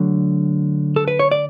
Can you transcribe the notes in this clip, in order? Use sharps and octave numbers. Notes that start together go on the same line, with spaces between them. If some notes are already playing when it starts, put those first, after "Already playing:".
Already playing: D3 F#3 A3
A4
B4
C#5
D5